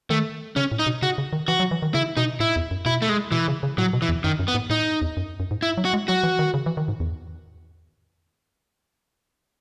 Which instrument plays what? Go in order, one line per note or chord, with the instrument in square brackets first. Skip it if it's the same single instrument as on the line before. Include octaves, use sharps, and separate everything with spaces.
[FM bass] D#3 [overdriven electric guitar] A3
[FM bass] C#3 [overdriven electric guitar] C#4
[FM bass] A2
[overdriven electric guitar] D#4
[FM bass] B2
[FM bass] C#3 [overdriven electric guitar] F#4
[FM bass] C#3
D#3
[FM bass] E3 [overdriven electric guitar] F#4
[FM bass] F#3
E3
D#3
[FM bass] C#3 [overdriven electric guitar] E4
[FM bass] B2 [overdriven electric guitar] D#4
[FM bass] A2 [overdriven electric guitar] E4
[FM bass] E2
F#2
[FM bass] B2 [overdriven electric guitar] E4
[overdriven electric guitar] A3
G#3
[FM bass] B2 [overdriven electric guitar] E3
[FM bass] C#3
C#3
[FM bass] A2 [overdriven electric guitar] F#3
[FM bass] B2
[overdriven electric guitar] E3
[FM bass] E2
[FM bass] F#2 [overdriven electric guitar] D#3
[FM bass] F#2
[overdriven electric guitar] B3
[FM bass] G#2
[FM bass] A2 [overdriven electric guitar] D#4
[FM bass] E2
F#2
F#2
G#2
[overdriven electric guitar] E4
[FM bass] F#3
[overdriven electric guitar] F#4
[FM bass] G#3
[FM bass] F#3 [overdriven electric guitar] F#4
[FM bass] E3
D#3
C#3
E3
D#3
G#2
E2